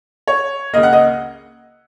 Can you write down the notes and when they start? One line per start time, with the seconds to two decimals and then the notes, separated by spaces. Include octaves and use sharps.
0.28 C#5
0.73 C#2 C#3 A#3 D#5
0.83 F#5
0.93 D#5